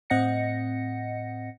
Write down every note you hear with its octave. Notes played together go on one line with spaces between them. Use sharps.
A2 C4 D#5 F#5 A#6 C#7